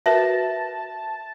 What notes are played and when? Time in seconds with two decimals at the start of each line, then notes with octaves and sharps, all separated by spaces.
0.06 F#4 A#4 B4 E5 A5